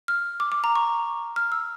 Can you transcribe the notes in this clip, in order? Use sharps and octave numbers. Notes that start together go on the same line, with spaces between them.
F6
D6
D6
A#5
C#6
F6
E6